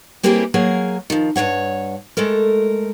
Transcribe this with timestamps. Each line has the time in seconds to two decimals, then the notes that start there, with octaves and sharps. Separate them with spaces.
0.23 G3 A#3 C4 E4 G4 G#4
0.54 F#3 A#3 G#4 A#4
1.10 D#3 F3
1.36 G2 E3 C#5 F#5
2.17 G#3 A3 A4 A#4